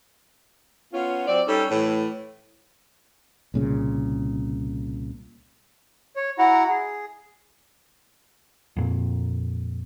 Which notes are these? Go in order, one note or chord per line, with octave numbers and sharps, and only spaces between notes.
B3 C#4 F4
F#3 C4 D5
G3 C#4 D#4 A4
A2 E3
C2 A#2 C#3
C#5
E4 F#4 F#5 A#5
G#4
F2 A#2